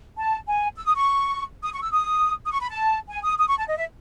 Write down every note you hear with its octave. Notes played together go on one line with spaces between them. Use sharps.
A5
G#5
E6
D#6
C#6
D#6
C#6
E6
D#6
D#6
C#6
B5
A5
G#5
D#6
D#6
C#6
A5
D#5
E5